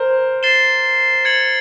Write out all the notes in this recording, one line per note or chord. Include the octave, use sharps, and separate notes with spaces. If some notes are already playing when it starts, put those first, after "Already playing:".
Already playing: A#4 C5
A6 C7 E7 G7
G#6 C#7 F#7